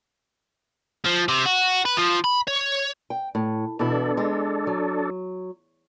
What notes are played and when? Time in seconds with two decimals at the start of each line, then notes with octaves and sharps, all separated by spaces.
1.06 F3
1.29 C3
1.46 F#4
1.85 B4
1.97 F3
2.24 B5
2.48 C#5
3.10 G5
3.35 A2
3.79 B2 E3 D4 E4 A4
4.17 G#3
4.67 F#3